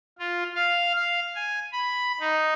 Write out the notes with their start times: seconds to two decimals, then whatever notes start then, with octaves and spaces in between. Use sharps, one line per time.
0.19 F4
0.55 F5
0.95 F5
1.35 G#5
1.73 B5
2.20 D#4